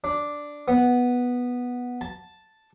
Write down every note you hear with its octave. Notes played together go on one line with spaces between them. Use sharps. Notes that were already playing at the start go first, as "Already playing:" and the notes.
D4
B3
A5